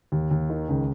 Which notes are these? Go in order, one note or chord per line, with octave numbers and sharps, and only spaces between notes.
D#2
D#2
D#3
C#2